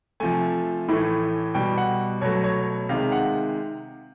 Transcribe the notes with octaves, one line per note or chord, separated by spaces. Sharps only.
C3 F3 A3 G#5
A2 E3 A3
B2 G3 G5
F#5
B2 F#3 A3 C#5
C#5
C3 D#3 G#3 F5
F#5